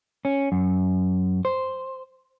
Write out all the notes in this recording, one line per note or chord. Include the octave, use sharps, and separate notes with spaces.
C#4
F#2
C5